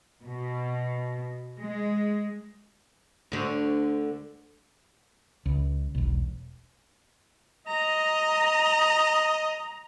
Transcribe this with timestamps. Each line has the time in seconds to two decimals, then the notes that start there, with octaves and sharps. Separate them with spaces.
0.22 B2
1.58 G#3
3.32 D2 D3
5.46 C#2
5.95 E1 B1
7.67 D#5 A#5